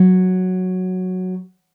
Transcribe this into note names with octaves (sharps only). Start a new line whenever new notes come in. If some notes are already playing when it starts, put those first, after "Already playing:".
Already playing: F#3